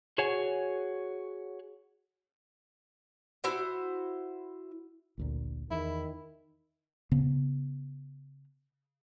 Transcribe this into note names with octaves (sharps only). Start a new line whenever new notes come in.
F#4 G#4 C#5 F#5 G#5
E4 F#4 C5 F#5
A1 D2 A#2
E2 D#3 E4
C#3 B3